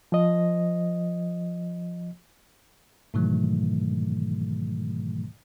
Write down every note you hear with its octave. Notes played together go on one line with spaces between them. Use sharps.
F3 D#5
G#2 B2 D#3 E3 F#3 A3